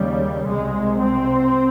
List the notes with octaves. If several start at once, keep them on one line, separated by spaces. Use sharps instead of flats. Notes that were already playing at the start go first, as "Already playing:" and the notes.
Already playing: D#2 C#3 G3
C2 C3 G#3
C4